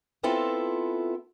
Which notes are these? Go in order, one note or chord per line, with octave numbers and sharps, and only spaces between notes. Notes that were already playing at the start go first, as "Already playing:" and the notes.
B3 C4 E4 F4 A4